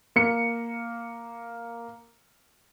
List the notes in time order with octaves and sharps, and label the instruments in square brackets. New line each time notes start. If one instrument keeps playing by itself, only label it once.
[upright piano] A#3 C#7